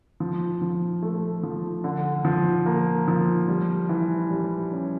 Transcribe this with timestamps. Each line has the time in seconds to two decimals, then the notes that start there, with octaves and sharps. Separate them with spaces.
0.20 F3
0.62 F3
1.03 A3
1.43 F3
1.84 D3
2.25 F3
2.66 A#3
3.08 F3
3.48 G3
3.89 E3
4.31 G3
4.72 C#4